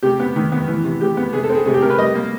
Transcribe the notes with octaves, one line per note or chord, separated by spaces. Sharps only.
C3 G4
B3
D#3
B3
E3
C3
G#3 G4
B3
C3 G#4
A4
C4
G#4
C3 G#4
G4
C3 A#4
B4
G3 D#5
A#3